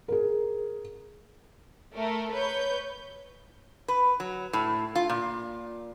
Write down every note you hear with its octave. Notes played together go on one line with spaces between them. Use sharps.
G#4 A#4
A3 A#4
B4 C#5 G6
B4
F#3
A2
F4
A#2